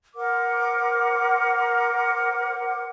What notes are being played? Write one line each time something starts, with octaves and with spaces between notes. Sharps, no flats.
A#4 C5 F#5 D6